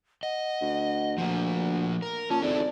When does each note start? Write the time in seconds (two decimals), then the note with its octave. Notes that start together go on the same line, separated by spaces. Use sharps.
0.23 D#5 F#5
0.61 D2
1.18 D2 F3 A#3
2.02 A#4
2.30 A#2 C#4 A5
2.42 G#1 G#3 E4 A4 D5